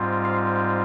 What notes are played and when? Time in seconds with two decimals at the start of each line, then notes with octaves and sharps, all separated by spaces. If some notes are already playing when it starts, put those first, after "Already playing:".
Already playing: G#2 G3 C4 F4
0.25 F5